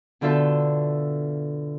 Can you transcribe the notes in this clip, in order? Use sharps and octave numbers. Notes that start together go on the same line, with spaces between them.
B2 D3 F4 A4 E5 G6